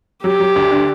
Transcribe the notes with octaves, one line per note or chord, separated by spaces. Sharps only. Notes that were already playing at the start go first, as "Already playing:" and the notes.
F#3 G4
F#3
D2
D3